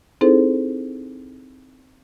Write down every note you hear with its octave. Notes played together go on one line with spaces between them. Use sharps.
C4 D#4 E4 G#4 A4 C5